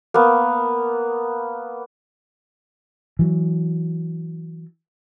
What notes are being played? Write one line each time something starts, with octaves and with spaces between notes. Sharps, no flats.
A#3 B3
E3 F#3